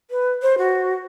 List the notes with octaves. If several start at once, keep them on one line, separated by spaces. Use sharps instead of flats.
B4
C5
F#4